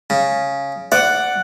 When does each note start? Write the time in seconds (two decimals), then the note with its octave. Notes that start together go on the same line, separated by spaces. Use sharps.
0.10 C#3
0.92 D5 F#5